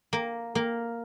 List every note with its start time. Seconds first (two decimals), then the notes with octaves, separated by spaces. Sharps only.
0.13 A#3
0.55 A#3